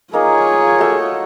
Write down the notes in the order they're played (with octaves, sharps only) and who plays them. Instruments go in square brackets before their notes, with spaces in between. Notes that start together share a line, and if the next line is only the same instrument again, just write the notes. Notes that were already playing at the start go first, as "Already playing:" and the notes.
[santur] A#3 D#4 [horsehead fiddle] F4 C#5 [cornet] G#4
[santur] A3 F#4